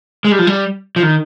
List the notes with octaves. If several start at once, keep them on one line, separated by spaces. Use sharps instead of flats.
G#3
G3
F3
G3
F3
D#3